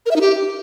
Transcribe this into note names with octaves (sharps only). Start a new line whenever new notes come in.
A#4
E5
D#4
G4